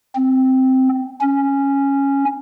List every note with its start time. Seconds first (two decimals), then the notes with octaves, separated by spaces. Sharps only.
0.16 C4
1.21 C#4